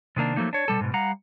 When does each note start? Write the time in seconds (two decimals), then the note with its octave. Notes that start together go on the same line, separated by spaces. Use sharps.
0.16 C3 D#3 A#3 D4
0.36 F3 F#3 A3 A#3 D#4
0.53 D4 C#5
0.68 B2 G3 A4
0.81 G#2 B2
0.94 G3 F5 F#5 A#5